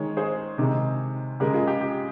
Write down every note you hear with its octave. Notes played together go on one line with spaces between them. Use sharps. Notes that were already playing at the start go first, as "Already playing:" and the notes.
Already playing: D#3 G#3 C#5
G#4 C5
C3 D#3 G#3
C#3 G#3 G4 A#4
F4 G#4
G4
G4